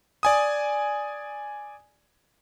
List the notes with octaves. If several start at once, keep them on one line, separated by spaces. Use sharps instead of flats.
D5 G#5 D#6